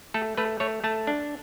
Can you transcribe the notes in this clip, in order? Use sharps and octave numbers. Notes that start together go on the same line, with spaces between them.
A3 A4
A3 B4
A3 C#5
A3 A5
D4